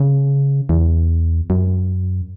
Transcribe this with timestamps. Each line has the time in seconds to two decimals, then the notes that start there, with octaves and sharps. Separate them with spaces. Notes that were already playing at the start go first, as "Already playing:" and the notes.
Already playing: C#3
0.69 E2
1.50 F#2